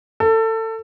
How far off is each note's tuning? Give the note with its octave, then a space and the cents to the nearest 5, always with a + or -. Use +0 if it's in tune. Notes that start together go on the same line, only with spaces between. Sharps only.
A4 +25